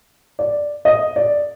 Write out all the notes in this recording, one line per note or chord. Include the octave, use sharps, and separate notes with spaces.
D5
D#5
D5